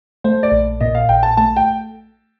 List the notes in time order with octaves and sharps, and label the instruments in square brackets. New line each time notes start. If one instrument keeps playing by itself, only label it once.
[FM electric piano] A3 [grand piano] C5
[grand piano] D5
[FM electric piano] A#1
[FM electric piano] A#2 [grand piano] D#5
[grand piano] F5
[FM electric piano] A#1 [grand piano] G5
[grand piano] A5
[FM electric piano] A3 [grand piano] A5
[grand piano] G5